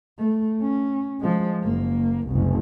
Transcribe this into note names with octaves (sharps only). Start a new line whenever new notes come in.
A3
C#4
F3 G#3
F#1 A#3
F#1 C2